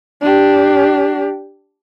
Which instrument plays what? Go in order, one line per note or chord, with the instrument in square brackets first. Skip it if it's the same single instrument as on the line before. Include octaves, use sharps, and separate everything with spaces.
[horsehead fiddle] D4 G4